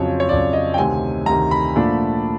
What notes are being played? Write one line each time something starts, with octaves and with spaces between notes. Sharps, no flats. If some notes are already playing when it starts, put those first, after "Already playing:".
Already playing: F2 C#3 F#3 C#5
C#5
F2 C#3 F#3 D5
D#5
G5
D2 C3 D#3 G#5
D2 C3 D#3 A#5
B5
A#2 F3 A3 D4